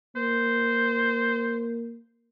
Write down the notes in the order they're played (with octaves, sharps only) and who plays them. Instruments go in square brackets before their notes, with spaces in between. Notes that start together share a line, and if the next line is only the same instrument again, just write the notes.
[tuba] A#3 [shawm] C5